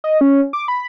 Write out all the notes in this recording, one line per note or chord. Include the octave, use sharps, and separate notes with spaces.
D#5
C#4
D6
B5